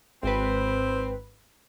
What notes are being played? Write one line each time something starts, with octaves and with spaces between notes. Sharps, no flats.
G#1 C4 B4